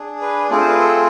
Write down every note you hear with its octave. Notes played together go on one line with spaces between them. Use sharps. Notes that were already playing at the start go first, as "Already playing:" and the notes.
Already playing: D4 G#4
B4
A3 C4 F4 G#4 D5
C5
B4
A4